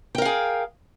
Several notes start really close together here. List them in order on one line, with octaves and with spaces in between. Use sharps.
G5 A#4 F5 G#4